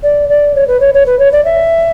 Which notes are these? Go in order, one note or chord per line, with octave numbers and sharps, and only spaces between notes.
D5
D5
C#5
B4
C#5
C#5
B4
C#5
D5
E5